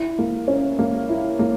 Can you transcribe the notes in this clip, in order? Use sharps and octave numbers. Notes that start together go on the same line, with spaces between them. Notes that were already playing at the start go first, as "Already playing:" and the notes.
Already playing: E4
A#3
C#4
A#3
E4
A#3